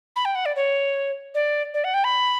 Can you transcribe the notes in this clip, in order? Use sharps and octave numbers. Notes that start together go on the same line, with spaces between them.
B5
G5
F#5
D5
C#5
D5
D5
F#5
G5
B5